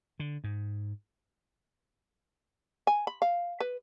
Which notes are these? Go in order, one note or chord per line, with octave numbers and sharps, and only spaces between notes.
D3
G#2
G#5
B5
F5
B4